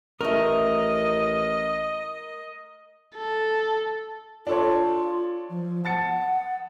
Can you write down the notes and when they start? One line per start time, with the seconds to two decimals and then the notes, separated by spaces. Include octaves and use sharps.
0.21 A1 A3 F#4 A#4 D#5
3.16 A4
4.47 D4 F4 A4 C#5
5.50 F3
5.85 F#5 A5 A6 C#7